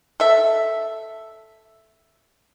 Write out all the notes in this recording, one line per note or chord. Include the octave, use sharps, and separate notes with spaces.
A4 E5